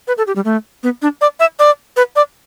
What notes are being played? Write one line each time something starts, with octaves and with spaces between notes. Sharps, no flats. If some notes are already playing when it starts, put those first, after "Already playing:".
B4
A4
G4
G3
A3
B3
D4
D5
E5
D5
B4
D5